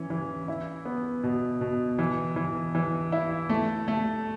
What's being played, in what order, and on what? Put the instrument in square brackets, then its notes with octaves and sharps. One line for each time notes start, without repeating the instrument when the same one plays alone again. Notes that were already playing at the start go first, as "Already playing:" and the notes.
Already playing: [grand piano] E3 C#4
E3
E4
B3
B2
B2
E3
E3
E3
E4
A3
A3